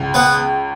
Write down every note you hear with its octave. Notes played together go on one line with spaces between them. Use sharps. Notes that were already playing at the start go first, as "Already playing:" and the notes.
Already playing: C#2
B3 B4